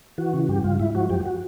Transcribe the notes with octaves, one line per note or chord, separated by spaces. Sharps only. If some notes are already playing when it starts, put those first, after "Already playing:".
E3 F#4
C#3
G2 G4
G2 F4
G#2 E4
F3 F#4
F#2 G4
F#4